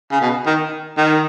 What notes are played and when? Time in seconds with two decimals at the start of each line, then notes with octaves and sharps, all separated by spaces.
0.11 C#3
0.21 B2
0.46 D#3
0.97 D#3